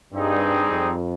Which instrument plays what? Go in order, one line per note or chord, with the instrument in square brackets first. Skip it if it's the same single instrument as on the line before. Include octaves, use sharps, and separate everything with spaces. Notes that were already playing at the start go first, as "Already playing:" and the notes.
[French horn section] G2 [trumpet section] G3 C4 D#4 G#4
[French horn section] F2